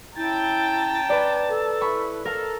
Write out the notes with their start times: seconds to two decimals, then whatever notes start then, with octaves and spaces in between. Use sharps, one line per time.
0.17 C#4 E4 G5 A5 A#5 A6
1.09 B4 D5
1.49 A4
1.81 E4 B4 B5 C#6
2.25 A4 A#4 F5